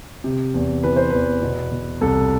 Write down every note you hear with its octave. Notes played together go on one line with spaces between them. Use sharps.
C3
E2
E3 B4
C5
E2 B4
B2
B2
C2 A4